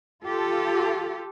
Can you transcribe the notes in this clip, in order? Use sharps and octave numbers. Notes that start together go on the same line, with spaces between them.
F4 G4 A4